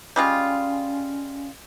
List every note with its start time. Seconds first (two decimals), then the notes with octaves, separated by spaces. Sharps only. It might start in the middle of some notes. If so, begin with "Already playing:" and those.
0.16 G3 G#3 C#4 F4